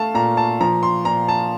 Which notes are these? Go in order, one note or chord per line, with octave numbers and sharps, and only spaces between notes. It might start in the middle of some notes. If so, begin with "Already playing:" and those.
Already playing: A3 F5 A5
A#2 A#5
A5
F3 A#5
C6
A#2 A#5
A5